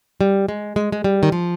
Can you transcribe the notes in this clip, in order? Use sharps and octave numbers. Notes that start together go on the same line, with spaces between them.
G3
G#3
G#3
G#3
G3
D#3
F3